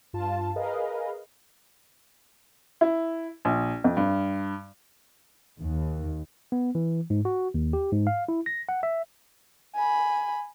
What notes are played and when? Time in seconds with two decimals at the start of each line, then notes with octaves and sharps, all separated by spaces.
0.13 G2 F4 A5
0.56 G#4 A#4 B4 D#5 F5
2.81 E4
3.45 A#1
3.84 F2
3.97 G2
5.61 D#2
6.52 B3
6.75 E3
7.10 G#2
7.25 F#4
7.54 D#2
7.73 G4
7.92 G#2
8.07 F5
8.29 E4
8.46 A#6
8.69 F#5
8.83 E5
9.75 G#5 B5